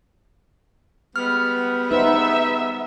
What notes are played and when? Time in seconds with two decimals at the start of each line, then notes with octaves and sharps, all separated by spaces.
1.16 G3 G#3 B3 F6
1.91 D#4 B4 C5 E5